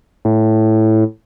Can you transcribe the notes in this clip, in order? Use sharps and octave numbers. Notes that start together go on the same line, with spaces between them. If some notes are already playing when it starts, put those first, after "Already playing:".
A2